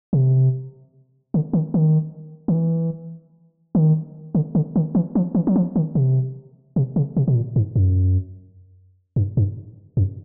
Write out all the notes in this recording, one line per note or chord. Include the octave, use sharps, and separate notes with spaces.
C3
D3
D#3
D#3
D#3
E3
D#3
D3
D3
D#3
E3
F3
E3
F#3
F3
D#3
C3
C3
C#3
C3
B2
A#2
G#2
F#2
G2
G2
F#2